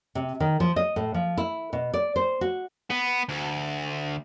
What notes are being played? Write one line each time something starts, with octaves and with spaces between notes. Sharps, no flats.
C3
D#3
F3
D#5
A2
F3
E4
B2
D5
C5
F#4
B3
D2